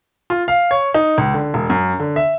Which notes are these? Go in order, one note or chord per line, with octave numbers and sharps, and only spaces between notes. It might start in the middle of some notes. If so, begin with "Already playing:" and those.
F4
F5
C#5
D#4
C#2
D3
E1
F#2
D3
E5